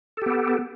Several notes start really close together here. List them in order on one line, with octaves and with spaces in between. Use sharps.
A4 G4 B3